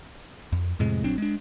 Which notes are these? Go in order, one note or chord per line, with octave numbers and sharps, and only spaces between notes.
F2
F2 A2 C3 G#3
A#1 F#3 C4 D4
G#3 D4